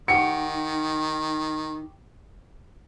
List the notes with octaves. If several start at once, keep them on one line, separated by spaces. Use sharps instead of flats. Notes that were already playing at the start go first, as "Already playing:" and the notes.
D#3 D#4 F#4 G4 C#7